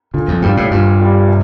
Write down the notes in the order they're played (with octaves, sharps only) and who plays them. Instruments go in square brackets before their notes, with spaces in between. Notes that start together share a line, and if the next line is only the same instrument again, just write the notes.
[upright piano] A#2 [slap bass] D3
[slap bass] F2
[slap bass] G2 [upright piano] G3 D4 F4
[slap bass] A2
[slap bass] G2 [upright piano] A#2
[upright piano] G3 D4 F4
C3